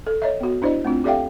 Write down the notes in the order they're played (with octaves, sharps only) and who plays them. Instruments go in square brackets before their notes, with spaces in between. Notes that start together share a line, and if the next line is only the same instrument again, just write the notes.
[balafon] A4
C#5 D#5 E5
B3 F#4
D4 E4 C5 D5 D#5
A3 C4 D4 F4
G4 A4 D5 E5 F5 G5